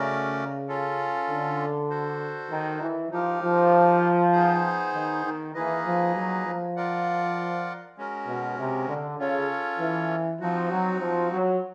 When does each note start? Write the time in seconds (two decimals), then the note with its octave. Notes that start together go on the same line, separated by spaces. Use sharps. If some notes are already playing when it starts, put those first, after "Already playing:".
Already playing: C#3 A3 C#4 F#4 A#4 D5
0.68 C#4 F4 A4
1.29 D3
1.90 F#4 A4 C5
2.50 D#3
2.82 E3
3.11 F3 D#4 G4 A#4
3.42 F3
4.33 B3 D#4 G#4 C5
4.94 D#3
5.24 D#3
5.54 E3 A#3 D#4 G#4 B4 D#5
5.85 F3
6.15 F#3
6.46 F3
6.76 F4 A#4 D5 F#5
7.97 G#3 C#4 F#4 A#4
8.27 B2
8.58 C3
8.88 D3
9.19 C#3 C#4 F4 A4 C#5
9.79 E3
10.40 F3 C4 D#4 F#4
10.71 F#3
11.01 F3
11.31 F#3